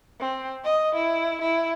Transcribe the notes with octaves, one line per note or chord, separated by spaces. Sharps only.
C4
D#5
E4
E4